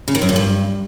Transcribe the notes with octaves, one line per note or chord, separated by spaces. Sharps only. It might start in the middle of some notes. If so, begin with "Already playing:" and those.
C#3
D#3
F#2
A#2
G2